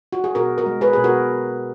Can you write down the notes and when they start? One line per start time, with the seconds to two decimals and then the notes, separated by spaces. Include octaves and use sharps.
0.13 F#4
0.24 G#4
0.35 B2 F#4 A#4
0.58 F#4 A#4
0.66 G#3
0.81 G#4 B4
0.93 B2 G#4
1.04 F#4 A#4